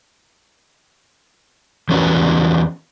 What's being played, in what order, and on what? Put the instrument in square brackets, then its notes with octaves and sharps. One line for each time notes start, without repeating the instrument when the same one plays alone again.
[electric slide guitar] E2 E3 C#4 F#4 A#4 B4